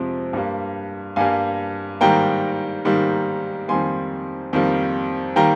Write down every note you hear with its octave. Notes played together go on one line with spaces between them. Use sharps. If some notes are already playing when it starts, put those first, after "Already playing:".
Already playing: F2 C3 F3 G#3
G2 G3 A#3
G2 G3 A#3 F5 G#5
G#2 D#3 G3 A#3 G5 A#5
G#2 D#3 G3 A#3
F2 D#3 G3 A#3 G#5 C6
F2 D#3 G3 A#3
D#3 G3 A#3 G5 A#5